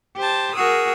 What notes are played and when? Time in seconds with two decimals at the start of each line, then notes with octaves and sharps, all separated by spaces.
0.17 G4 C5 A5
0.55 F#4 G#4 A#4 D#6 E6